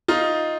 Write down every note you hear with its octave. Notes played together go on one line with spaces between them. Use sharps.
D#4 F4